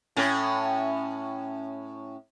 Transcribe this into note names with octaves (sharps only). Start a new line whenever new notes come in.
A2 C#4